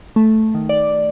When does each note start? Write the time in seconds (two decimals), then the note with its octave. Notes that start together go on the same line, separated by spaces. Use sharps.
0.16 A3
0.54 D#3
0.69 D5